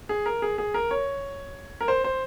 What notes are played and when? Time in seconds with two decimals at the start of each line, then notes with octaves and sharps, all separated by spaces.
0.09 G#4
0.26 A#4
0.42 G#4
0.58 G#4
0.74 A#4
0.91 C#5
1.81 A#4
1.88 C5
2.04 C5